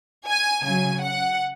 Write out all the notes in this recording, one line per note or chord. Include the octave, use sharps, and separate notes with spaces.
G#5
C#3 F#3 G#5
F#5